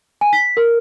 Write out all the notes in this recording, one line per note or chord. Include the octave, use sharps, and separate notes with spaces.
G#5
B6
A#4